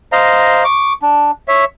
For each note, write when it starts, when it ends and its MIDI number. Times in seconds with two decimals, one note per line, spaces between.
0.12 0.64 72
0.12 0.64 75
0.12 0.64 77
0.12 0.64 82
0.64 0.93 85
0.64 0.93 86
1.02 1.31 62
1.48 1.64 73
1.48 1.64 76